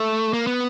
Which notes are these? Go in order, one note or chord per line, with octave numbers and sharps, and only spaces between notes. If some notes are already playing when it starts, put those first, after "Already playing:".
Already playing: A3
A#3
B3